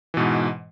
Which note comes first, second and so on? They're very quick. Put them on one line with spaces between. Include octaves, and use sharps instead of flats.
E3 B2 G#2